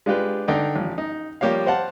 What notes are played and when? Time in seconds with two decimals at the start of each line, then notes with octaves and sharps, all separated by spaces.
0.06 G#3 D4 F4 G4 B4
0.48 D3 D#4 G5
0.76 A1 F3
0.98 D#4
1.41 F3 G3 A#3 G4 C#5 F5
1.66 C5 F5 F#5 A5